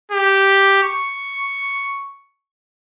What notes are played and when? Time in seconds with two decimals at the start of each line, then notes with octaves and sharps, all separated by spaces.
0.12 G4
0.83 C#6